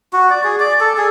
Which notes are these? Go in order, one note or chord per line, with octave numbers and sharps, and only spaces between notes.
F#4
D5
G#4
D5
A4
G#4